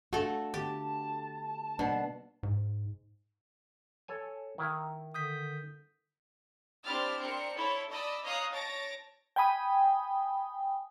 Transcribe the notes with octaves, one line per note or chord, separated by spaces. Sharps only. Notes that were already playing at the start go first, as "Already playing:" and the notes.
A3 D4 F#4 A4 F5
D3 B3 G4 A5
B2 G3 A#3 D4 C5
G#2
A4 C#5 G#5
D#3 E4
D3 D#6 G6 B6
C4 D4 E4 G4 F6 A6
C4 D4 A#4 C#7
E4 A4 C#5
D5 D#5 A5 B5 E6
C#5 D#5 F5 A#5 D#6 F#6
C#5 A5 A6 A#6 D7
G5 G#5 B5 D#6